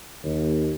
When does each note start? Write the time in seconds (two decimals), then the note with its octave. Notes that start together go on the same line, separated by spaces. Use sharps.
0.24 D#2